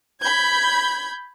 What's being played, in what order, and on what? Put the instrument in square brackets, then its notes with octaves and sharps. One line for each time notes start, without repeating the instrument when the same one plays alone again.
[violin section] B5 G6 G#6